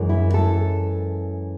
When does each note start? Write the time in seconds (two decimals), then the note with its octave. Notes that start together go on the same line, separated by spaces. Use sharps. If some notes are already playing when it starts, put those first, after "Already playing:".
Already playing: F#2 E3 G#3
0.09 E4
0.34 A4